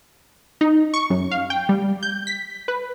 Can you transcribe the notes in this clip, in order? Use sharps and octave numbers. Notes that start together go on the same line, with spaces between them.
D#4
C#6
F#2
F5
G5
G3
G6
B6
B4